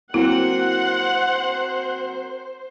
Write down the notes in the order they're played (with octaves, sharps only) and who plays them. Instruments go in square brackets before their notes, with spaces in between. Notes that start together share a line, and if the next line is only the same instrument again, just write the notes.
[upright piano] F#3 A#3 C4 [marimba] E4 [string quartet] C5 [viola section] F#5